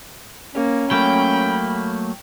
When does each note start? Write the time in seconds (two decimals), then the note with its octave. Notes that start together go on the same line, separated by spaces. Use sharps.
0.55 A#3 C#4
0.91 F#3 A3 A#3 G5 B5